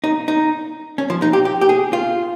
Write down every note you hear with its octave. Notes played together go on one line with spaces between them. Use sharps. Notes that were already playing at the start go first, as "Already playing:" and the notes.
D#4
D#4
C#4
F3
D#4
G4
G4
G4
G#4
F4